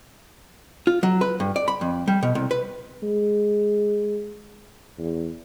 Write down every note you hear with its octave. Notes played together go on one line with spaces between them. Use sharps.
F4
F#3
B4
G2
D5
B5
F2
G3
B2
C2
B4
G#3
E2